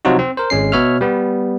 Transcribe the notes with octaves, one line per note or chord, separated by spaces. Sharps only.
C3 F3 F#3 D#4 F4 F#4
C4
A#4 C5
G#1 G#3 C#4 C7
B2 C#5 E5 F6
G3 B3